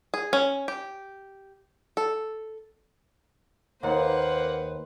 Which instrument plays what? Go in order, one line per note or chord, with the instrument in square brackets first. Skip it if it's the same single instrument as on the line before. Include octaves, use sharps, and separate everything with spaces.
[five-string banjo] G#4
C#4
G4
A4
[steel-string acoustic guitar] D#2 [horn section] A#3 F#5 [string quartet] B4 C5